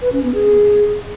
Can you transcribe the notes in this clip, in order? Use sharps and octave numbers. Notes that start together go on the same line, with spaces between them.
B4
C#4
B3
G#4